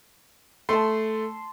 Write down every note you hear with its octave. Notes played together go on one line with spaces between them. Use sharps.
A3 A5 C6